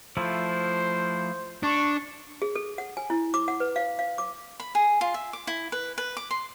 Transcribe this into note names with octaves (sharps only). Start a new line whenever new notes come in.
F3 A3 E4 C5
D4 C#6
G#4
A4
F#5
G#5
E4
D6
F#5
B4
F5
F5
D6
B5
G#4
F4
E5
D6
E4
B4
B4
D6
C6